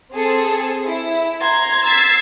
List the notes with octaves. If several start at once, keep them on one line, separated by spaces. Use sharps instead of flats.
C4 G#4 A4
E4
A#5 C6 G#6
E6 G#6 A6 B6 C7